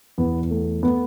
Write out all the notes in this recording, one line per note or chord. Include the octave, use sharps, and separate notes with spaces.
E2 B3
A3
A3 B3